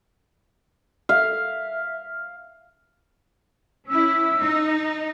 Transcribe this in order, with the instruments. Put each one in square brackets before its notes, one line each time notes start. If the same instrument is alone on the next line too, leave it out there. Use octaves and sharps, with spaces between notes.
[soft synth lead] E5 [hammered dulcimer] F5
[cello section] C#4 E4 [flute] E6
[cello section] D#4